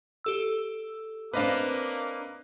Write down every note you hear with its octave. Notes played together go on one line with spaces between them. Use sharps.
G4 A4 E6
A#3 C4 D4 B4 D#5 F5 D6